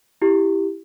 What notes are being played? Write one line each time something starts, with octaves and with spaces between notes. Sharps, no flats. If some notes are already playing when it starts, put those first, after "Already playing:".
E4 G4